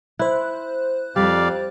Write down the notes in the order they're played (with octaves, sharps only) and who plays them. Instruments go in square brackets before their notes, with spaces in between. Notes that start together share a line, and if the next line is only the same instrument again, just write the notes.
[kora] E4 [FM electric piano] C5 F#6
[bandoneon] F2 D5 F5 [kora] G3